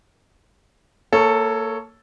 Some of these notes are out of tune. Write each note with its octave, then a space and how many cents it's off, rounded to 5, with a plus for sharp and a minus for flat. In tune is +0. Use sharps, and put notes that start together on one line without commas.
A#3 -25 A4 +0 C#5 +0